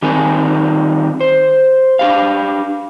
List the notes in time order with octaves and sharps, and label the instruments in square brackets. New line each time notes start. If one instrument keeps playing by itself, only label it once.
[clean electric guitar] D#3 G3 C4 D#4 A#4 G#5
C5
D4 G4 F5